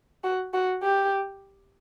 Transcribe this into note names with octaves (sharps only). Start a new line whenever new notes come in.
F#4
F#4
G4